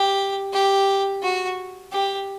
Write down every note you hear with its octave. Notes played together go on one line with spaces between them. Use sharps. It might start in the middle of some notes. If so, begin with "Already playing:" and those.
Already playing: G4
G4
F#4
G4